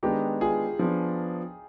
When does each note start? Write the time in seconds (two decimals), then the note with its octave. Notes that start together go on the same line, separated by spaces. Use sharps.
0.03 D#3 G#3 B3 D4 D#4 G4
0.41 F4 G#4
0.79 F3 B3 D4